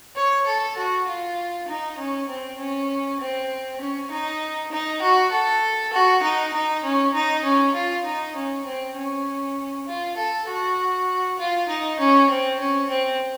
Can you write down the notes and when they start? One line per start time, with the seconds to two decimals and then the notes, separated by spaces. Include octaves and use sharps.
0.16 C#5
0.47 A4
0.77 F#4
1.07 F4
1.68 D#4
1.98 C#4
2.29 C4
2.59 C#4
3.20 C4
3.81 C#4
4.11 D#4
4.71 D#4
5.01 F#4
5.32 A4
5.93 F#4
6.23 D#4
6.53 D#4
6.83 C#4
7.14 D#4
7.44 C#4
7.74 F4
8.05 D#4
8.35 C#4
8.65 C4
8.95 C#4
9.87 F4
10.17 A4
10.48 F#4
11.38 F4
11.69 D#4
11.99 C#4
12.30 C4
12.60 C#4
12.90 C4